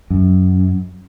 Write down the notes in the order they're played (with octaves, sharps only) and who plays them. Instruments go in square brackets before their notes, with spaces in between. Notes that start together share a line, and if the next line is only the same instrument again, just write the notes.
[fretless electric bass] F#2